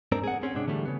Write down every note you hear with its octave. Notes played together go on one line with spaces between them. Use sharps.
G#2 C4 D4 A#4
G#4 F#5
C4 C#4 G#4
G#2 C3 D4
D3 E3 G3 A3
C#3 B3